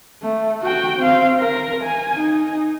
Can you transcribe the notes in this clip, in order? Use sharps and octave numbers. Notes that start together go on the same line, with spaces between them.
A3
F#4 G5
C4 F5
A#4
G#5
D#4